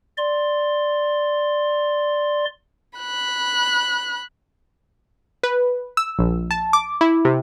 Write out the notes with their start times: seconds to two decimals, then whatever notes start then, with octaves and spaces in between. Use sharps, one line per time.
0.18 D5 C6
2.99 B5 F#6
5.43 B4
5.97 E6
6.19 A#1
6.51 A5
6.73 D6
7.01 E4
7.25 C3